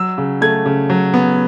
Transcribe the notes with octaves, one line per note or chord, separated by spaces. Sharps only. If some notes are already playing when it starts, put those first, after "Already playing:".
Already playing: F#3 E6
C#3
A3 G#6
C#3
F#3
B3